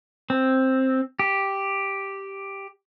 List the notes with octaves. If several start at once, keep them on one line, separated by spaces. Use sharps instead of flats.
C4
G4